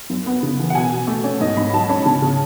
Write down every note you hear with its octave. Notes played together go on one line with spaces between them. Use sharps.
F#2
B3
C#3
E3
F#5
B2 G#5
B2
A3
C#4
G#2 D#5
G#2 B5
F#3 A5
C#4 B5
C#3 A5
C#3